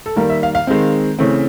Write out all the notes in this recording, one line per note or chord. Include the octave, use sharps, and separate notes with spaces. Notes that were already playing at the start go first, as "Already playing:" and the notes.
A4
D#3 G3 A#3 A#4
E5
F5
F5
D#3 G#3 C4
C#3 E3 A3 C4